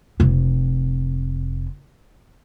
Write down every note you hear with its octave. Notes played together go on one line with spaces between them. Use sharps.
F1 C3